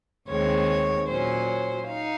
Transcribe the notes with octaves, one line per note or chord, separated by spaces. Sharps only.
D#2 D#3 G#3 C4 C#5
A#2 F#3 C#4 C5
D#4 F5